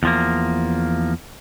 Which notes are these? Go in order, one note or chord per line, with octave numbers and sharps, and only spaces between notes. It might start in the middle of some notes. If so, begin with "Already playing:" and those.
E2 F3 A#3